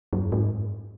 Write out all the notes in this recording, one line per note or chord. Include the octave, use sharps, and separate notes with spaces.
F#2
G#2